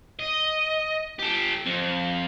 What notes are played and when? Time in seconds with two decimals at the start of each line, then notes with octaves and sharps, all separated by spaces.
0.19 D#5
1.19 G4 A4
1.66 F2